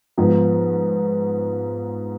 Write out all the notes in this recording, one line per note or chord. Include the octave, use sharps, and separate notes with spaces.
G#2 F3 B3